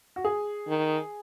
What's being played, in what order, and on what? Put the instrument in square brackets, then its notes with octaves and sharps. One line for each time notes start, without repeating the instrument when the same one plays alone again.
[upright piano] F#4
G#4
[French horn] D#3